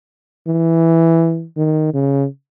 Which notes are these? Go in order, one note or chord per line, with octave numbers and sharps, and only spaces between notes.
E3
D#3
C#3